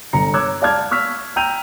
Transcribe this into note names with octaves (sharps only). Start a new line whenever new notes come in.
G1 A#5 C#7
C#5 D6 E6 F#6 G#6
D5 F5 A5 D6 F6 G#6
C#6 E6 F6 B6
G5 A#5 E6 G6 D#7 F7